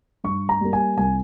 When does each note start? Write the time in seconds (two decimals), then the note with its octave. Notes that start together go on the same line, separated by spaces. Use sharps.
0.24 G2 C#6
0.49 A#5
0.61 G3 A#3
0.73 G#5
0.98 C2 G#5